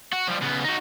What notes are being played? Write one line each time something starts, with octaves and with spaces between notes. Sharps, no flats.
F#4
F3 G3
C#3 B3
D#4 F#4